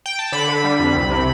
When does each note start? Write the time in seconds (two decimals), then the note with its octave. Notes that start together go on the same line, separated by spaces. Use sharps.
0.06 G5
0.19 A5
0.32 D3 B5
0.48 D3
0.64 G3
0.79 F2
0.95 C2
1.10 C3